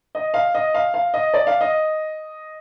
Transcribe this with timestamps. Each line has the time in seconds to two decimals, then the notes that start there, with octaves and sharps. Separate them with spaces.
0.15 D#5
0.34 F5
0.55 D#5
0.74 F5
0.94 F5
1.14 D#5
1.34 D5
1.47 F5
1.61 D#5